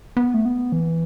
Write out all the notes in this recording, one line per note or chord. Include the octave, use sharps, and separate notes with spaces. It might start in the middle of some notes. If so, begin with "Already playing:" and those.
B3
A3
B3
E3